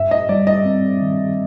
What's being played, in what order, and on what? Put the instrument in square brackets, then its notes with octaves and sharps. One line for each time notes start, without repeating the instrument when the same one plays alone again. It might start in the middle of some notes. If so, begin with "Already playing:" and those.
Already playing: [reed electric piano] G2 [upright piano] E5
[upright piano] D#5
[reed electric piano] G3 [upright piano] D5
[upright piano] D#5
[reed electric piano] C4
D#3